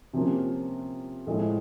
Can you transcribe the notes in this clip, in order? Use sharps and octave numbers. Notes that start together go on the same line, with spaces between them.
C3 F3 A#3 C#4 F4
A2 F3 G#3